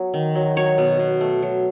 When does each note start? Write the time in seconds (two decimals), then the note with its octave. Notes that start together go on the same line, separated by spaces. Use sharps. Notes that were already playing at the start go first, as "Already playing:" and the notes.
Already playing: F#3 B3
0.14 D#3
0.35 F#3
0.57 F#3 C#5
0.78 B2
0.99 B2
1.21 A3
1.43 F#3